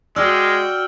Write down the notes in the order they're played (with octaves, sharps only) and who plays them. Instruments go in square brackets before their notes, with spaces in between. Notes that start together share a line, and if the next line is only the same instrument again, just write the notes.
[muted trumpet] G#3 [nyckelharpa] F#4 G5 [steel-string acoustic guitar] D5 [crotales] E6 F6